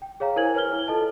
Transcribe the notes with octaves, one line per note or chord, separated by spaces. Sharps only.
G5
G#4 C#5 F5 A#5
E4 A#4 C5 G#5 G#6 F#7
B4 C#5 G#5 F6 G7
E4
F4 A4 D#5 A5